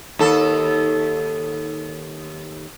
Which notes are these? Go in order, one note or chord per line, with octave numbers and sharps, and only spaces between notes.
D#2 A4